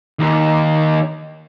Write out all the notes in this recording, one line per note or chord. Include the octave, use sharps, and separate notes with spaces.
D#2